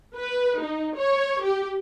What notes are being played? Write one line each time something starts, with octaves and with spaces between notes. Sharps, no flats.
B4
D#4
C#5
G4